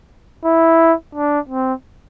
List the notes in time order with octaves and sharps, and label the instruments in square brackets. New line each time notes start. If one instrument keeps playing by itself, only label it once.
[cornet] E4
D4
C4